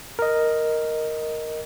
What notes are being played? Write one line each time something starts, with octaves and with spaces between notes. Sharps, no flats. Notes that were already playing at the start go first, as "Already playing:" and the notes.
A#4 D#5